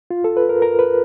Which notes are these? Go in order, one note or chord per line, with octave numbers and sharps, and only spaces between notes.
F4
A4
B4
A#4
A#4
B4